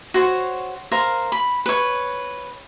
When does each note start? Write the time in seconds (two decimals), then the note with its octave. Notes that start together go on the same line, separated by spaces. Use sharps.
0.14 F#4 C5 C#5
0.91 A#4 C5 F5
1.32 B5
1.66 B4 C#5